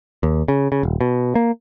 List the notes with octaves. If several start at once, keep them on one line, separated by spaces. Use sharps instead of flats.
D#2
C#3
C#3
D#1
B2
A#3